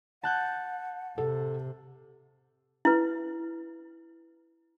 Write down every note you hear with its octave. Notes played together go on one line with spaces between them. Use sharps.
F#5 A5 F#6 G6
C3 A4
E4 B4